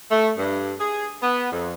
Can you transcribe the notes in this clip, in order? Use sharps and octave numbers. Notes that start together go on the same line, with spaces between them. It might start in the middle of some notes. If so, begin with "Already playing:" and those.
A3
G2
G#4
B3
F2